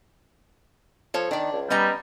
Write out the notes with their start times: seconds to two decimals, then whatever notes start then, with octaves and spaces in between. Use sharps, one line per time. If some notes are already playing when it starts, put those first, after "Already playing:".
1.14 F3 A4 C#5 A5
1.31 D#3 D4 D5
1.52 C#2
1.70 G3 B3 C#4 D#5 A#5